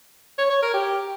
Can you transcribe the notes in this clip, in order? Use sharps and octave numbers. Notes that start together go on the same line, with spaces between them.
C#5
C#5
A#4
G4